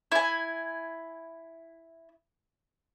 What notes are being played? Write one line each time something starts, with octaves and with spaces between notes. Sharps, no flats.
E4 G#5